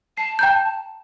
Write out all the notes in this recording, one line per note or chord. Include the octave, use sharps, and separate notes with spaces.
A5 C7
G5 A#5 G6